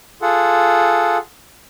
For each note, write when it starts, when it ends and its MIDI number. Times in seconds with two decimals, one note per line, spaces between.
0.22 1.18 65
0.22 1.18 68
0.22 1.18 69
0.22 1.18 78